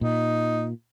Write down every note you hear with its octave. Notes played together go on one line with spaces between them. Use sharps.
A#2 D#4